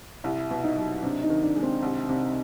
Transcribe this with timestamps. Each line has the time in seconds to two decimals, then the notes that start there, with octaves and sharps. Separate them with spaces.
0.24 C2 E4
0.51 B2
0.64 D#4
0.77 F#3
1.03 C3 D4
1.23 D#4
1.30 D#3
1.43 D4
1.56 G#3
1.62 C4
1.82 C2
2.09 C3